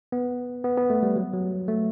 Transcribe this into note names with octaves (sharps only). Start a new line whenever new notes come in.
B3
B3
B3
A3
G3
F#3
F#3
A3